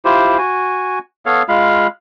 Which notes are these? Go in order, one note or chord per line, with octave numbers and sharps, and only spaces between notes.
E4 F4 G4 C5
F#4 G#5
B3 A4 C#5 F5
G#3 F4 F5 B5